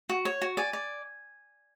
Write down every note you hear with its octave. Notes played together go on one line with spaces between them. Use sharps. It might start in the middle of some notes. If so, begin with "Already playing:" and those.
F#4
C#5
F#4
D5 G#5
D5